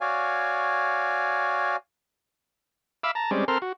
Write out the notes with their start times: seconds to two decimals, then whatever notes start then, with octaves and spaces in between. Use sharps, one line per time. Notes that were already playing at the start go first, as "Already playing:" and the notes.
0.01 F#4 C#5 D5 F5 G#5
3.04 E5 F5 B5 D6 E6
3.15 A5 A#5
3.31 G3 G#3 C4 C#4 D5
3.48 C4 A4 A#4 C6 F6
3.62 F#4